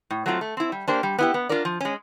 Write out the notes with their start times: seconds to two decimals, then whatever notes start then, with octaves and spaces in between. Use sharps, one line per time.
0.10 A2
0.26 F#3 A3 C4 F4
0.41 A3
0.57 C4 E4
0.72 G3
0.88 A#3 D4 G4 C5
1.03 G3
1.19 B3 E4 G4
1.34 B3
1.49 D4 F4 A#4 D5
1.65 F3
1.81 G#3 C#4